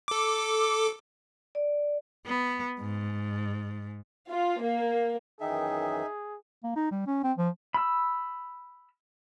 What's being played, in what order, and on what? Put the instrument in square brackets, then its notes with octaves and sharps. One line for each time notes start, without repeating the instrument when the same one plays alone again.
[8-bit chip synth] A4 D6
[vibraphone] D5
[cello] B3
G#2
[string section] F4
A#3
[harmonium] F#2 D#3 E3 [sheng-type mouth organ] D#4 E5 [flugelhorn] G#4 [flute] G5
[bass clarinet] A#3
D#4
G3
C#4
C4
F3
[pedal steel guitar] B5 E6